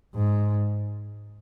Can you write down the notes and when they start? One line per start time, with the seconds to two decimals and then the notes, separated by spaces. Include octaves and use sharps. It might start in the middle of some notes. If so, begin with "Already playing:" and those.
0.15 G#2